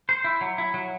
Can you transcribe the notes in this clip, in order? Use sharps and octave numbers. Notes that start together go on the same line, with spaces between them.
C5
E4
F#3
E4
F#3